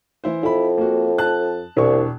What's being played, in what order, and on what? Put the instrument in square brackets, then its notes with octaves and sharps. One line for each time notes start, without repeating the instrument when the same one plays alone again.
[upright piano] E3 E4 C5
[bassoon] F2 [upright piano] E4 B5
[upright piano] A#3 F#4
A5 F#6
[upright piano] E1 D4 C#6 [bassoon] C2